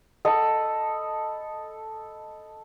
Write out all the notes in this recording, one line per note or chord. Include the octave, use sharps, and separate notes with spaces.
A4 D#5 B5